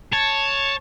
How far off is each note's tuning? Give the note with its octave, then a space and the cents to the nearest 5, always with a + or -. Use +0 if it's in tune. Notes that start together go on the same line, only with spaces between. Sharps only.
C#5 +0 A5 +0